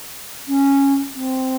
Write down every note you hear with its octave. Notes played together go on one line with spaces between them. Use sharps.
C#4
C4